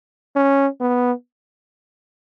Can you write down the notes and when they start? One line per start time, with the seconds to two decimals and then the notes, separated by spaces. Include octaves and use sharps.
0.36 C#4
0.80 B3